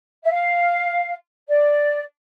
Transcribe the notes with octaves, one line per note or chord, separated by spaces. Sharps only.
E5
F5
D5